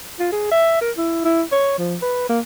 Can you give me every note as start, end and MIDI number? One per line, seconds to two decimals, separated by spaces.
0.19 0.30 65
0.32 0.49 68
0.51 0.77 76
0.81 0.91 70
0.97 1.21 64
1.25 1.42 64
1.52 1.77 73
1.78 1.96 53
2.02 2.29 71
2.29 2.40 58